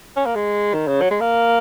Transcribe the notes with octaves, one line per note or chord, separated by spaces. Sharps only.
C#4
A#3
G#3
D#3
C#3
F#3
G#3
A#3